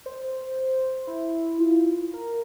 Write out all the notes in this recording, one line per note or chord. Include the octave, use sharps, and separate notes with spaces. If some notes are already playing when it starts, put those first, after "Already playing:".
C5
E4
F4
A#4